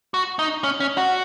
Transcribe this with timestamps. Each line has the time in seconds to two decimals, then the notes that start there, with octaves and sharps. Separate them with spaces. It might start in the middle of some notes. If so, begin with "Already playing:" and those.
0.14 F#4
0.39 D#4
0.64 C#4
0.80 C#4
0.97 F#4